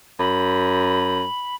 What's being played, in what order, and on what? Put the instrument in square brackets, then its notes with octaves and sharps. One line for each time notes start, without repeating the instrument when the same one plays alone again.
[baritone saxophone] F#2 [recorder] B5